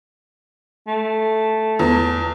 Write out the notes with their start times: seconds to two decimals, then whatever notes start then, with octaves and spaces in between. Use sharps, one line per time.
0.87 A3
1.79 E2